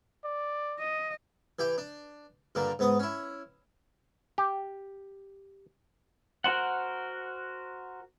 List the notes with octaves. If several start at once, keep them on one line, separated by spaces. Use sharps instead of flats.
D5
D#5
E3 G4 G5
D4
G2 A#2 D3 A#3
G#2 B3 D#6
C#4 E4
G4
F#4 A#4 C5 F#5